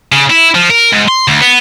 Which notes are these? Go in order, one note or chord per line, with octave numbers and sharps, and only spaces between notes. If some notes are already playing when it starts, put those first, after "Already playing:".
C#3
E4
F3
A#4
G#2
C6
D2
B3